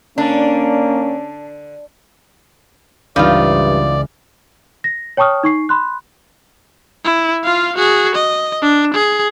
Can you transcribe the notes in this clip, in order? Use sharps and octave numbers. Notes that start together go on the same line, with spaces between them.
D3 A#3 C#4 D4
C#2 G2 C#3 E3 C4 D#4 F4 D5
A#6
C#5 G5 A5 C#6 D#6 F6
D#4 C#6 C7
B5 C6 F#6
E4
F4 F5
F#4 G#4
D#5
D4
G#4